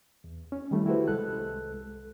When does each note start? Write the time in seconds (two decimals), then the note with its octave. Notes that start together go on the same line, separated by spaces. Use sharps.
0.24 E2
0.52 C#4
0.71 D#3 G3 A3 E4
0.86 E4 F#4 G4 A4 B4 C5
1.08 C2 G#3 A4 F#6